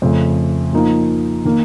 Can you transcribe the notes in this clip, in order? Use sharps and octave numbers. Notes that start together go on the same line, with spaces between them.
F2 C#3 A3
F3 A#3 D#4
D#3 A#3 D#4